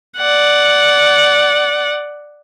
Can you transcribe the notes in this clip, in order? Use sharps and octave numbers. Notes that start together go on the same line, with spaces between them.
D5 F#5